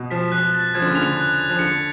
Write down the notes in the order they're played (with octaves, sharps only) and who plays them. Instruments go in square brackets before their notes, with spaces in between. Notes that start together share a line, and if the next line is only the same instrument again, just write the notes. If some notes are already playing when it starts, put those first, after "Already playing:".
Already playing: [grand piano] B2
[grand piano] F3 [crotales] B6
[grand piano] F3 [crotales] F#6
[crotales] A6
[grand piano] F3 [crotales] G#6
[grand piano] D3
C#3
[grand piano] D3 [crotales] F7
[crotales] F#6
F#6
[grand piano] F3
[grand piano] D3 [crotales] C#7